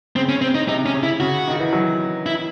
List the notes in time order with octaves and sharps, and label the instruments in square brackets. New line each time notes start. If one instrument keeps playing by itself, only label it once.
[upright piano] C#3 [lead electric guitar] C4
[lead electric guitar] C#4
C4
D#4
[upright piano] C3 [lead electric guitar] D#4
[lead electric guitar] C#4
[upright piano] C#3
[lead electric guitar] E4
[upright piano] C#3 [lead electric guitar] F#4
[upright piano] D#3
E3
F#3
[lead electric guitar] E4